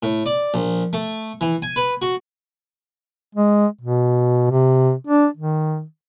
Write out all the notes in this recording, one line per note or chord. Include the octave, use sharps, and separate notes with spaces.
A2
D5
A#1
A3
E3
G#5
B4
F#4
G#3
B2
C3
D4
D#3